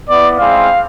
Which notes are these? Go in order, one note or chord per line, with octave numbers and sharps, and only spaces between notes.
B3 E4 D5
G#3 C4 E4 F5